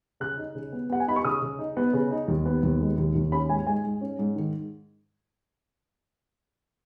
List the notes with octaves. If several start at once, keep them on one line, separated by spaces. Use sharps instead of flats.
C#3 F#6
D#4
C#3
B3
B3 F#5
G#5
D#4 B5
C#6
C#3 D#6
C#3
D#4
B3
C#3
D#4
D#2
B3
D#2
G#3
D#2
D#2
C#4 B5
G#2 G#5
G#3 G#5
G#2
C#4
G#2
D#3